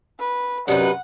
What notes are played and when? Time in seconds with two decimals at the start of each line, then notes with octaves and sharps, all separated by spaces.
0.19 B4
0.68 F#2 C3 D#4 B4 D5 F#5